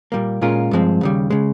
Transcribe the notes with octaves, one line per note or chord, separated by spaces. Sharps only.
A#2 G3 A#3
A#2 G#3 C#4 F4 A#4
G2 F3 G#3 C4
D#2 C#3 G3
C#3 G#3